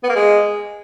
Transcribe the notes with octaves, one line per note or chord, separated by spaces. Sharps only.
B3
A#3
G#3